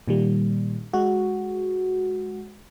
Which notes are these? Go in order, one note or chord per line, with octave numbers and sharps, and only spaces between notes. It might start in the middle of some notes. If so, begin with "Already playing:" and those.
A#2 D#3 G3
G#3 F#4